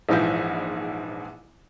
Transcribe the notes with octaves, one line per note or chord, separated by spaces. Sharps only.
A#1 G#2 E3 F3 E4 G6